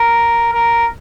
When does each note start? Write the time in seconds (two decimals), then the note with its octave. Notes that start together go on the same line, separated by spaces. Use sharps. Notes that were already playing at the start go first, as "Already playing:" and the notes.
Already playing: A#4
0.53 A#4